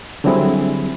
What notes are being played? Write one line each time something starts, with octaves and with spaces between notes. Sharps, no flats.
D3 F#3 G3 C4 E4 G#4